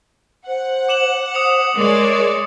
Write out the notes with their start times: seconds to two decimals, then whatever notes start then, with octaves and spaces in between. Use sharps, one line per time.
0.48 C5 F#5
0.89 D6 E7 F#7
1.34 C5 D#6 C#7 F7
1.76 G#3 A#4 C#5 D5